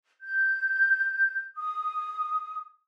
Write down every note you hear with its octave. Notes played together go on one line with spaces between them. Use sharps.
G6
D#6